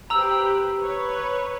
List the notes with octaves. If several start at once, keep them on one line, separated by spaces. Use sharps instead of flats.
G4 B4 C5 A#5 E6 F#7
B4 C#5